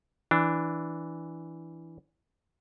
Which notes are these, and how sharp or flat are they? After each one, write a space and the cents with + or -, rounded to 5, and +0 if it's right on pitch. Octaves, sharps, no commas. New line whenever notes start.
E3 +0 D4 +0